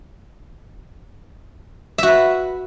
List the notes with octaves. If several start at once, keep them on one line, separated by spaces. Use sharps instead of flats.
F#4 B4 E5